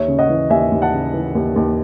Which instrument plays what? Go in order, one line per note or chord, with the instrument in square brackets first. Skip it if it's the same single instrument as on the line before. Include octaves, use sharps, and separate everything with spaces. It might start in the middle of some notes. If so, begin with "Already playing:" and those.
Already playing: [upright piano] D#2 C#5 E5
C#3
D#5 F#5
E3
D#2 E5 G#5
D#2
F#5 A5
C#3
E3
D#2
D#2